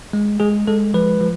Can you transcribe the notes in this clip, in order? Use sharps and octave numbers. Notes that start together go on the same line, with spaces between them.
G#3
G#3 G#4
G#3 A4
F3 B4
F3